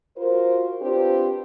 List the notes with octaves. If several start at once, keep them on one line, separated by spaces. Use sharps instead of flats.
F4 F#4 A#4 C5
C4 D4 F4 G4 B4 C5